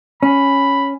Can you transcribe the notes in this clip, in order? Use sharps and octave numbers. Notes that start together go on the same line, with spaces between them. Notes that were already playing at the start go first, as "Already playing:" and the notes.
C#4 B5